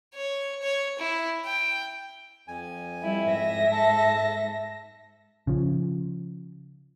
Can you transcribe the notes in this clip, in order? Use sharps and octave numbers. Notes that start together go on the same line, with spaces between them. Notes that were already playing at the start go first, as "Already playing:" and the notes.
C#5
C#5
E4
G5
F2 G#5
G3 E4
G#2 E5 A#6
A4 A5
C#3 F3